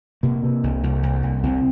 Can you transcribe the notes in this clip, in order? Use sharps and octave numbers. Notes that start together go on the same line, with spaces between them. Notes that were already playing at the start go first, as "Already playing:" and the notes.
C3 A#3
C3
C2
C2
C2
C2
C2 C4